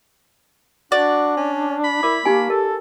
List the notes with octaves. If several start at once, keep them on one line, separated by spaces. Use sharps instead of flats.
D4 F#4 D5
C#4
B5
E4 A#4 D6
A#3 D#4 G4 G#5
A4 A#4